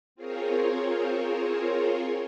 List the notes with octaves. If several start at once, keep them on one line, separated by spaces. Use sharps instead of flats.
C4 F4 G#4 A#4 C5 C#5